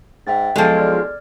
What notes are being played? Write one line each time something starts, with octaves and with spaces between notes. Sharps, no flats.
G#2 E5 G5 A6
B1 F3 G#3 A4 D#5 D7
D5 F6 G#6